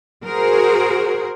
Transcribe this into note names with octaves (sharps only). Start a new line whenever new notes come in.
F#4 G#4 A#4 C5